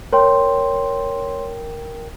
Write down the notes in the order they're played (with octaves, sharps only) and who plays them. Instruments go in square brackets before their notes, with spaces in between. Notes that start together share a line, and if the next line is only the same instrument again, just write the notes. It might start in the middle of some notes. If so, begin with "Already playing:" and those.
[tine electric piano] A#4 G5 [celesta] C#5 C6